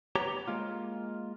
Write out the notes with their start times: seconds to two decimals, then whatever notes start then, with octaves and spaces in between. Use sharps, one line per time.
0.16 B3 G4 C#5 A#5
0.48 G#3 A#3 F4